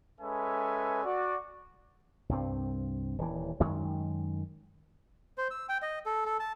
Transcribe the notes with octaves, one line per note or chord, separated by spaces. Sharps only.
G#3 C#4 A4 B4 E5 G#5
F#4 D5
C2 G2 C4
D#1 E3
F#2 D#3 G#3
C5
E6
G5
D#5
A4
A4
A5